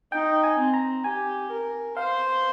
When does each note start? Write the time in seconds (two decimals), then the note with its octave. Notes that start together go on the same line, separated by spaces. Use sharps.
0.12 D#4 G5
0.44 G#5
0.58 C4
0.74 A#5
1.04 G4 G#5
1.51 A#4
1.97 C5 F5